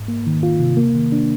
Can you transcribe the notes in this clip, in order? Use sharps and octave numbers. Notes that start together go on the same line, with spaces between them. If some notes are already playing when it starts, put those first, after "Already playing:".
Already playing: G#2
A#3
D#3
F4
C3
A#3
D#3
D4